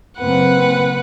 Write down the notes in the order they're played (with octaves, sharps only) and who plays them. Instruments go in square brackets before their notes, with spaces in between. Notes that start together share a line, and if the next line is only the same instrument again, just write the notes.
[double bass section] F#1 A#3 C4 [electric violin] B4 F#5